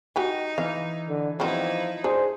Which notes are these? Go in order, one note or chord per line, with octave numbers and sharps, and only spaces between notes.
D#4 F#4 G4 G#5
E3 F5
D3
F3 G3 B3 C4 D#4 E4
D4 G#4 C5